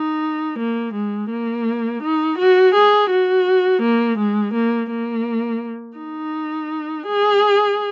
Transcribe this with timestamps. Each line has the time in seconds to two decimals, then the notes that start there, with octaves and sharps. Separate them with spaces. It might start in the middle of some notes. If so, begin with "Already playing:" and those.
Already playing: D#4
0.59 A#3
0.94 G#3
1.31 A#3
2.03 D#4
2.39 F#4
2.75 G#4
3.11 F#4
3.82 A#3
4.18 G#3
4.54 A#3
4.90 A#3
5.98 D#4
7.07 G#4